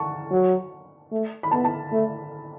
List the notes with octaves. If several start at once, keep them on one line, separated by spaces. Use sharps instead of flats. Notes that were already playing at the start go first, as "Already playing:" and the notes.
Already playing: F#5 A5 C#6
F#3
A3
B5
B3 A5
A5
A3